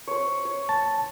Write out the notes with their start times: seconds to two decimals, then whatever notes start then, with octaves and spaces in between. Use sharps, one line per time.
0.07 C5 C#5
0.45 C#5
0.69 A5